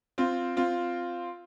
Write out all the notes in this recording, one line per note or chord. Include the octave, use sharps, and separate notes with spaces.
C4 F4
C4 F4